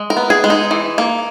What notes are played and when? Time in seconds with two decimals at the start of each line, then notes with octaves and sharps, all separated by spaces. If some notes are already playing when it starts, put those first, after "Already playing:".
Already playing: G#3
0.10 A#4
0.17 B3
0.30 G#4
0.44 G#3
0.50 D#4
0.71 E3
0.98 A#3